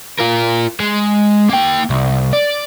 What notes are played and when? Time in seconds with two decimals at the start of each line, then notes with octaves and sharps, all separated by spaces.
0.19 F4 A#4
0.80 G#3
1.49 A#3 G5
1.90 C2
2.33 D5